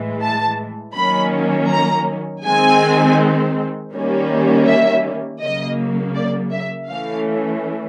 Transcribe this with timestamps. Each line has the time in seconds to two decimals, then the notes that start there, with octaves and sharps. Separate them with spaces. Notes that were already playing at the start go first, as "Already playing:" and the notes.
Already playing: A2 E3 G#3
0.22 A5
0.95 D#3 F#3 A#3 C#4 B5
1.70 A#5
2.44 D#3 G#3 C4 G#5
3.93 D#3 G3 A#3 C#4
4.67 E5
5.41 C#3 F#3 A#3 D#5
6.15 D5
6.52 E5
6.89 E3 A3 C#4 F5